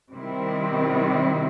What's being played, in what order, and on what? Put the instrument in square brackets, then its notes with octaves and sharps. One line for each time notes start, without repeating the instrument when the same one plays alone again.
[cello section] C3 D#3 G3 C4 E4